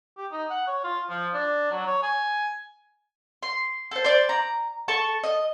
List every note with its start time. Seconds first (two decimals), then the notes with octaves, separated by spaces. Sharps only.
0.18 G4
0.32 D#4
0.50 F#5
0.67 C#5
0.84 F4
1.10 F3
1.34 D4
1.71 F#3
1.87 C#5
2.03 G#5
3.43 C6
3.91 A4 C5
4.04 C5 D5
4.29 A#5
4.88 A4 A5 C#6
5.24 D#5